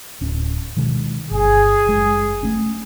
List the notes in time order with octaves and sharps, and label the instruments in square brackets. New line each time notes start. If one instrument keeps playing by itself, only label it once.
[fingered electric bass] D1 C#4
B2 D#3 G#3
[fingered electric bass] G1 [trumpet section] G#4
[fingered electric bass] F#1 G#3
A3 C#4